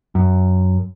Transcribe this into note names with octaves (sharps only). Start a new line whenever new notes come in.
F#2